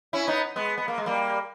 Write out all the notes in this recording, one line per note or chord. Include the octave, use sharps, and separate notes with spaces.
C#4 E4
B3 D#4
G#3 B3
B3
A#3
G#3
G3 A#3